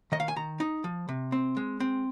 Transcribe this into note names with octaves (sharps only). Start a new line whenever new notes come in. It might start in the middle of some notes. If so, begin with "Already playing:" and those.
D#3 D#5
F5
G#5
D#3 A#5
D#4
F3
C3
C4
G#3
C4